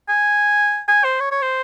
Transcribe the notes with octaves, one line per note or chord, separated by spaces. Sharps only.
G#5
G#5
C5
C#5
C#5
C5